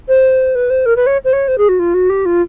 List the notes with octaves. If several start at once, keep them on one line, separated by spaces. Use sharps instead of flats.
C5
B4
C5
A#4
B4
C#5
C5
C#5
C5
G#4
F#4
F4
F#4
G4
F4